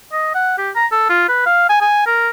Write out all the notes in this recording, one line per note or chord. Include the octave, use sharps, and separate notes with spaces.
D#5
F#5
G4
A#5
A4
F4
B4
F5
G#5
G#5
A#4